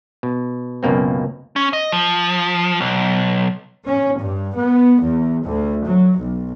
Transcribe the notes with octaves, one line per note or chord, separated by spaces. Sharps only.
B2
C#2 F#2 B2 A#3 C4
C#4
D#5
F3
B1
C#4
G2
B3
E2
D2
F#3
B1